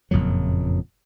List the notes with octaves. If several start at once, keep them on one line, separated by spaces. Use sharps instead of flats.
F#1 F2 A#2 F#3